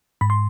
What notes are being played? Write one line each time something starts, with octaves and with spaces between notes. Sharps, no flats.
G#2 B5
C6